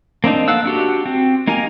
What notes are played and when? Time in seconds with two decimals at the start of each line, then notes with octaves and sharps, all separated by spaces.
0.24 A#3 C4 D4 D#4
0.48 A4 F5 F#5 E6
0.65 D4 F#4 G4
1.06 C4
1.47 A#3 D#4 G4 A#4 G#5